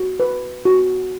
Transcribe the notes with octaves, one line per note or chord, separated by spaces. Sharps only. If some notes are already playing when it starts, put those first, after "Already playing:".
Already playing: F#4
B4
F#4